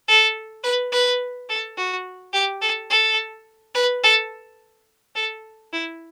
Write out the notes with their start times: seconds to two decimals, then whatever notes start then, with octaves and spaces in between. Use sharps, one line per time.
0.08 A4
0.63 B4
0.92 B4
1.49 A4
1.77 F#4
2.33 G4
2.62 A4
2.90 A4
3.75 B4
4.04 A4
5.15 A4
5.73 E4